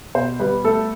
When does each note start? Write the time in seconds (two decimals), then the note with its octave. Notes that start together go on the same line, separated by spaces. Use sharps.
0.15 B2 C5
0.39 G3 B4
0.64 A3 A4